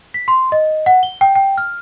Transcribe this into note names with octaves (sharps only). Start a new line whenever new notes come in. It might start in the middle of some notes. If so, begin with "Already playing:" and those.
B6
C6
D#5
F#5
G7
G5
G5
F6